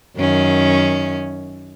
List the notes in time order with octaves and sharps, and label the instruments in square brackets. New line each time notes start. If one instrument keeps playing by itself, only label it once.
[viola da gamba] F#2 D#3 C#4